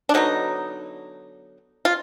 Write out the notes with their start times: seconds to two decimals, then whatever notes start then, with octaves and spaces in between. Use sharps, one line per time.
0.09 D4
0.14 D3 F#3 B3 D#4
1.85 F4